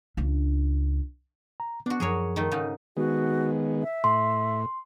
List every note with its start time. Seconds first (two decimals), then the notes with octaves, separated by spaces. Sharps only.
0.17 C#2 D4
1.60 A#5
1.86 B3 D4 F#4
2.00 F#2 F3 G#4 A#4 C#5
2.36 D#3 A3
2.51 G#2 C#3 D#4
2.97 D#3 G#3 B3 F#4
3.83 E5
4.04 A2 C6